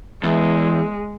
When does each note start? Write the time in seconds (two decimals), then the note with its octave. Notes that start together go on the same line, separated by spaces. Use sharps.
0.23 E2 G#3